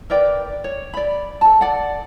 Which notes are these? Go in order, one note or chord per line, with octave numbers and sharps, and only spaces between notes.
A#4 B4 D5 G5
C#5
D5 B5
A4 A5
D5 F#5